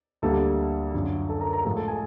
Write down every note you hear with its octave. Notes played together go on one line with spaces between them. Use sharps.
D2 D3 G3 A#3 A4 A5
F#2 D3 F3
A4 A5
A#4 A#5
A#4 A#5
A2 F3 G#3 A#4 A#5
A4 A5
G#4 G#5